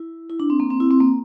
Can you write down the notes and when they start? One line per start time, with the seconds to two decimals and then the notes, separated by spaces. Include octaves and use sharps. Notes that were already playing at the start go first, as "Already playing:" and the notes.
Already playing: E4
0.30 E4
0.40 D4
0.50 C4
0.60 A#3
0.70 C4
0.80 E4
0.91 C4
1.00 A#3